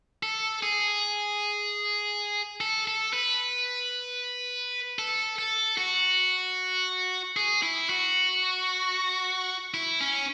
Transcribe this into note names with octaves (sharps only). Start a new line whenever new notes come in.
A4
G#4
A4
A4
B4
A4
A4
F#4
G#4
E4
F#4
E4
C#4